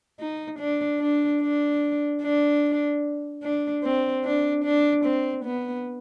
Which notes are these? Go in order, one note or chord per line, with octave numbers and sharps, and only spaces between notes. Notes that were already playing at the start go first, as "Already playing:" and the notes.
D#4
D4
D4
D4
D4
D4
C4
D4
D4
C4
B3